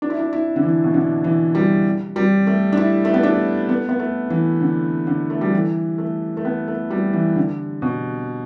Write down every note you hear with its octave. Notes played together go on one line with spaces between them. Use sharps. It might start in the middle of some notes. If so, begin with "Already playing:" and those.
D4
E4
D4
E4
D3
E3
B2
D3
E3
G3
G3
A3
D4
E4
A3
B3
D4
B3
B3
A3
E3
D3
D3
A3
G3
E3
A3
A3
B3
A3
G3
E3
D3
B2